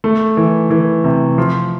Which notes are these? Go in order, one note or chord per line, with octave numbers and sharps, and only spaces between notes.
A3
E3
E3
C3
F3